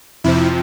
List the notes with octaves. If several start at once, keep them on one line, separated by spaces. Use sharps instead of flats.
F2 C3 F3 E4